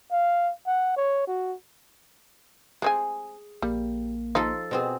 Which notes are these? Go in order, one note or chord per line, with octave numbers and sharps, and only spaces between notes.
F5
F#5
C#5
F#4
G#3 C4 G#4 G#5
A#1 G3 A#3
F3 D#4 F4 A4
B2 C4 G#4